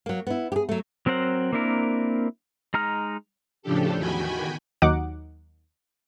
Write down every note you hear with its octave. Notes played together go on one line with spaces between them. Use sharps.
F#3 A#3
B3 E4
G4 G#4
F#3 A3
F#3 C4 A#4 C5 F#5
A#3 C4 D4 E4 A#4
G#3 D#4 A#5 F6
A2 C#3 F3 D4 G4 A4
E2 D#3 F#4 G5 G#5 B5
D#2 D#3 F#3 D#4 F#5 D6